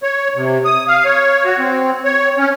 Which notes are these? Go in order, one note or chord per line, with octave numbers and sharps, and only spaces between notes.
C#5
C3
D#6
F5
C#5
F#4
C4
C#5
C#4